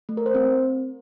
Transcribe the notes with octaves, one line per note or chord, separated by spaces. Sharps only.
A3
A#4
C5
C4